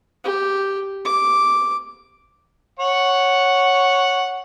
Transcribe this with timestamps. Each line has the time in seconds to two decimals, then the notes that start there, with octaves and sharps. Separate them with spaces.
0.24 G4
1.05 D6
2.79 C#5 F#5